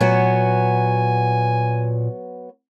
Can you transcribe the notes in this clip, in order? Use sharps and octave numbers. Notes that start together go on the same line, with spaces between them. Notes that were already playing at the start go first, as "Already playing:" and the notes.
A#2 F#3 B3 F#4 G#5